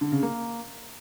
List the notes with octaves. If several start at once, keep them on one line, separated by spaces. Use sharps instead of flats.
D3
C#3
A#3